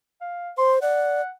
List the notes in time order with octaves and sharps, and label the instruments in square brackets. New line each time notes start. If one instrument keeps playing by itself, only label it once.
[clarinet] F5
[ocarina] C5 [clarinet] C6
[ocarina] D5 [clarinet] F#5